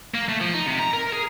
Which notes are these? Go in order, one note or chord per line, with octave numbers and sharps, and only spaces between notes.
A#3
A3
F3
D#4
C3
A#5
A#4
G#4